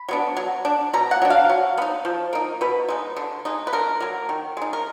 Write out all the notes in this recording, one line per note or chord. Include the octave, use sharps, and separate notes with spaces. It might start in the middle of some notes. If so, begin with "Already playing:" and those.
Already playing: B5
F#3 B3 D4
F#3
D4
B2 A#5
F#5
F#3 D4
F5
F#3
B3
D#4
F3
A#3 D#4
B2 B4
G#3 D#4
D3
G#3 D#4
B4
D3 A#4
F#3 A#3
D#3
G#3 D#4
A#4